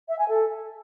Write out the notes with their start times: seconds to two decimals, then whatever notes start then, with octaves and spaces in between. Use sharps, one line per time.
0.09 E5
0.19 G#5
0.29 A4